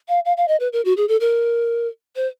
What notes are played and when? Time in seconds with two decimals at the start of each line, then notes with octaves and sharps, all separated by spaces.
0.08 F5
0.25 F5
0.37 F5
0.48 D#5
0.60 B4
0.73 A#4
0.85 F#4
0.97 G#4
1.08 A4
1.20 A#4
2.16 C5